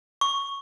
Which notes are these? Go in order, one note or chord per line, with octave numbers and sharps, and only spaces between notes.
C#6